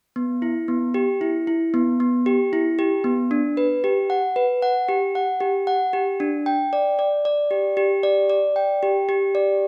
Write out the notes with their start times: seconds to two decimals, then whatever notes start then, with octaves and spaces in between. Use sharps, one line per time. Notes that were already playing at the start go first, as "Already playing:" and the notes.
0.16 B3
0.42 E4
0.68 B3
0.94 G4
1.21 E4
1.47 E4
1.74 B3
2.00 B3
2.26 G4
2.53 E4
2.79 G4
3.04 B3
3.31 D4
3.57 B4
3.84 G4
4.10 F#5
4.36 B4
4.62 F#5
4.88 G4
5.15 F#5
5.40 G4
5.67 F#5
5.93 G4
6.20 D4
6.46 G5
6.73 D5
6.99 D5
7.25 D5
7.51 G4
7.77 G4
8.03 D5
8.30 D5
8.56 G5
8.83 G4
9.09 G4
9.35 D5